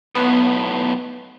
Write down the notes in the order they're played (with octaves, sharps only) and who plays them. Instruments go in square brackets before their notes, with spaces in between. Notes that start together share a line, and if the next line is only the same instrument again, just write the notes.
[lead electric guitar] B1 A2 [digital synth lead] B3